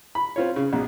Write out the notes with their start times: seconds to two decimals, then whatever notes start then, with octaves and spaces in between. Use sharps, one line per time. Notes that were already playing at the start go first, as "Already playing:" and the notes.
0.15 B5
0.36 C4 F4 C#5
0.56 C#3
0.73 A#1 B2